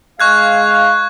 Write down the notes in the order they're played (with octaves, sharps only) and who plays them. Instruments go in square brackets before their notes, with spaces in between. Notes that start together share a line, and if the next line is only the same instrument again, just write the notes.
[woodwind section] G#3 F5 [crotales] C#6 F#6 G#6